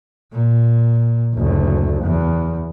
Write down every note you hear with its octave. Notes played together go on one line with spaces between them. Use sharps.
A#2
F#1 D2
E2